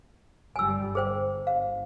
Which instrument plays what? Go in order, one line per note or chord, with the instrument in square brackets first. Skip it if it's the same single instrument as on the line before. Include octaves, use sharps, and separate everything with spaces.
[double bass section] G1 G3 [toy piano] G#5 E6
[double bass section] G1 [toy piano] G#4 C5 G5
[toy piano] F5